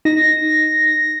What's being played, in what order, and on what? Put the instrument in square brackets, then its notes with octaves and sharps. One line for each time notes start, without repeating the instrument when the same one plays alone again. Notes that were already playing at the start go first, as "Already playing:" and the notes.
[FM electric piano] D#4 [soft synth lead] A#6